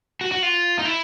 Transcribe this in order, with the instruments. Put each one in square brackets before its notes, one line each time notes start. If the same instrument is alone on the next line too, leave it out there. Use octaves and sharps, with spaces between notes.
[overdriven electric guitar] F#4
F#4
F4
D#4
E4